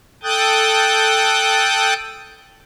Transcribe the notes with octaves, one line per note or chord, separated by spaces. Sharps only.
A4 G5 D#6 F#6 G6 A6